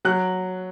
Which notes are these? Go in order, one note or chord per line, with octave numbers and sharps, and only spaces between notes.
F#3 F#6